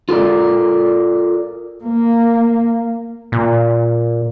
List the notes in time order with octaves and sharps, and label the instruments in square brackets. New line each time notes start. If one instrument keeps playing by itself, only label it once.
[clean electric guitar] F4 A4 A#4 D5
[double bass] A#3
[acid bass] A#2